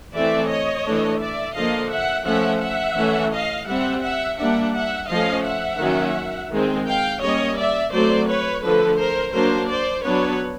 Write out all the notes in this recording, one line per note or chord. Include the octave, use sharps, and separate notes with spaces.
E3 A3 C4 D5 E5
C#5 D#5
E3 A3 D4
D5 E5
D3 F3 A#3 D#5 F5
E5 F#5
F3 A3 C#4 E5 F#5
E5 F#5
E3 A3 C#4
D#5 F5
G3 C4 E5 F#5
E5 F#5
G3 A#3 D4 E5 F#5
E5 F#5
F3 A3 C#4 D#5 F5
E5 F#5
D#3 F#3 A#3 C#4
D#3 G#3 C4
F5 G5
G3 A#3 C#4 C#5 D#5
D5 E5
F#3 A3 C4 C5 D5
B4 C#5
D3 F3 A3 A4 B4
A#4 C5
F#3 A#3 D4 A#4 C5
C5 D5
F#3 B3 D4 B4 C#5